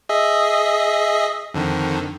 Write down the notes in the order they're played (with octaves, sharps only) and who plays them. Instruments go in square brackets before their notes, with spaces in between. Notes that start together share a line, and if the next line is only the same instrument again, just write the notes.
[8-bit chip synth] G#4 D#5 E5
F2 D3 D#3